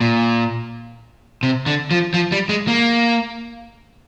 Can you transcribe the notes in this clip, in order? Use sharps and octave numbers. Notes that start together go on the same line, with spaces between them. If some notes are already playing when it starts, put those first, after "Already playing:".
A#2
C3
D3
F3
F3
G3
G#3
A#3